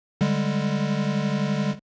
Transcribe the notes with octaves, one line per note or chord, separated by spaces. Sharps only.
D3 G3 G#3